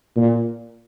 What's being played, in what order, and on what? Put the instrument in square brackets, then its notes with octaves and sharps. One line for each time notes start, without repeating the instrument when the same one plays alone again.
[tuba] A#2